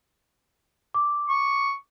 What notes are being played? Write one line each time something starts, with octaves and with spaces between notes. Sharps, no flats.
D6
C#6